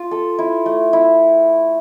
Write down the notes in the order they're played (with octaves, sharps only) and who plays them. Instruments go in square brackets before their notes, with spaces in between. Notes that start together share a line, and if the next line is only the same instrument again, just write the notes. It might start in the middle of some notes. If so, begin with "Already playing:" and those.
Already playing: [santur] F4
A4
E4
A3
E4